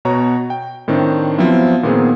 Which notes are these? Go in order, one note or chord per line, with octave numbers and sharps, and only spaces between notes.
B2 F#4 C#5 A#5
G5
A2 D#3 C4 D4
F3 F#3 B3 C4 E4 F4
A#2 D#3 B3 C4 F4 G#4